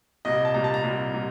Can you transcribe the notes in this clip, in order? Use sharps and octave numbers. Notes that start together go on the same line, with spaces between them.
C2 A#2 G3 D#5
A5
C2 A#2 G3 A#5
A5
A#5
C2 A#2 G3
A#2 G3